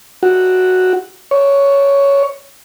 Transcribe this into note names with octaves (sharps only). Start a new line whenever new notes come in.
F#4
C#5